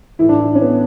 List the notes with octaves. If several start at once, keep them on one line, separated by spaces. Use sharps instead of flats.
A2 E3 E4
D4
E4
C#4
B3